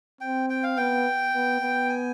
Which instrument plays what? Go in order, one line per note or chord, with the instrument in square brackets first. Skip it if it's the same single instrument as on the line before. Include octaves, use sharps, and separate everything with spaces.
[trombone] C4 [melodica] G5
[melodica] G5
F5
[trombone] B3 [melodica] G5
[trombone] B3
B3
[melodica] G#5